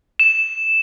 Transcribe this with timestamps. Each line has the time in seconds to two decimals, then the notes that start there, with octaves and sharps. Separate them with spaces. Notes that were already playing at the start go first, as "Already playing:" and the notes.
0.20 E7